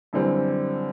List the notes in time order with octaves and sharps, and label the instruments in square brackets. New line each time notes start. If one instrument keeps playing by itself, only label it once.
[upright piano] F#2 D3 E3 G3 C4